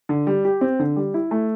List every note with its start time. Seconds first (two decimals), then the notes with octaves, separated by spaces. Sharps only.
0.09 D3
0.27 G3
0.45 G4
0.61 C4
0.79 D3
0.96 G3
1.14 E4
1.31 A3